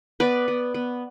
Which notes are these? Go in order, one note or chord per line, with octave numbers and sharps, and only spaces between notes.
B3 B4 D5
B3
B3